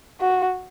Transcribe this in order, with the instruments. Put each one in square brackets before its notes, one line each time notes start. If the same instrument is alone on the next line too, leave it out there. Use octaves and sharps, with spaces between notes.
[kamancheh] F#4